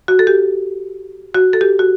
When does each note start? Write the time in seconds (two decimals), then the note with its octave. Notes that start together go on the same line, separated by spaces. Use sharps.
0.08 F#4
0.19 A4
0.27 G4
1.34 F#4
1.53 A4
1.61 G4
1.79 F#4